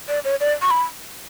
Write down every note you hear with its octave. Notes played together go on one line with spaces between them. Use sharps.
D5
C#5
D5
C#6
B5